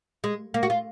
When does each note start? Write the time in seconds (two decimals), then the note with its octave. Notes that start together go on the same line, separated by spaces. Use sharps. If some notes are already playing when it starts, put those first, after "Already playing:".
0.24 G#3
0.54 A#3
0.63 F#4
0.70 F4